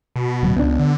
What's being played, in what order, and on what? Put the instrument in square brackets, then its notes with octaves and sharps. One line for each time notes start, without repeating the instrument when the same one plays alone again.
[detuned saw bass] B2
[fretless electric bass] D1 F#3 [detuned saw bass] B2
[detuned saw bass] C#2 [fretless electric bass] B3 D4
[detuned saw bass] D3